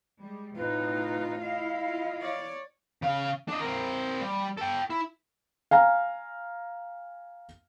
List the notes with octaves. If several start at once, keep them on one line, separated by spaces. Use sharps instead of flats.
G3 G#3
A2 C3 D#4 F4 B4
E4 D#5 F5
F4
C#5 D5
C#3 F5
D4 D#5
C4 A#4
G3
A4 G5
E4
F5 G#5 A#5